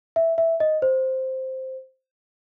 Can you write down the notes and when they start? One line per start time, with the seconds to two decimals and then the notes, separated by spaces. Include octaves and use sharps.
0.16 E5
0.38 E5
0.60 D#5
0.82 C5